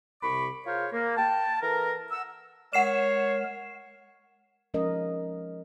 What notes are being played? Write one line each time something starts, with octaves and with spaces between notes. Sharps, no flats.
C2 C3 B5 C#6 D6
F4 G#4 A#4 C5 C#5
A#3
G5 A5
E3 A4 A#4
F#5 E6
G#3 A#4 C#5 F#5 C7 E7
F3 G#3 C#4 A#4 D#5